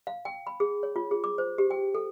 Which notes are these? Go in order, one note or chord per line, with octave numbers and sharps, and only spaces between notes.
F5
G5
B5
G#4
C#5
F4
G#4
D6
C5
G4
G5
A4